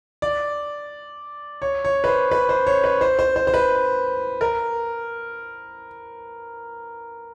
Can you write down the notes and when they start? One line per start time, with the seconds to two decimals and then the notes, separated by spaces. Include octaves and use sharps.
0.22 D5
1.62 C#5
1.85 C#5
2.04 B4
2.08 C5
2.31 B4
2.49 C5
2.67 C#5
2.84 B4
3.01 C5
3.19 C5
3.36 C5
3.47 C5
3.54 B4
4.41 A#4